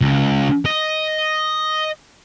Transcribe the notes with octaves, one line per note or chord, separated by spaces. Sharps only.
C#2
D#5